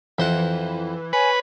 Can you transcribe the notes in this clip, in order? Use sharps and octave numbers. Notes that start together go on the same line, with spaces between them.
F2 E3 C5 F#5
B4 C#5 G#5